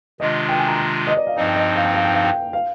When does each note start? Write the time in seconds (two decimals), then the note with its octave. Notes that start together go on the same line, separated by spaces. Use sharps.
0.20 C3 D#3 G#3 D4 F4 D#5
0.49 G5
0.59 G#5
0.68 A#5
1.07 D#5
1.17 D5
1.27 F5
1.36 G2 F3 C4 D#4 D#5
1.46 G5
1.56 D#5
1.76 F5
1.85 G5
1.95 F5
2.05 G5
2.14 F5
2.24 G5
2.53 F5